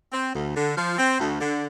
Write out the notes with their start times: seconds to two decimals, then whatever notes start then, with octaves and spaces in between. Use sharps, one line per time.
0.11 C4
0.34 D2
0.55 D3
0.76 F3
0.98 C4
1.19 D2
1.40 D3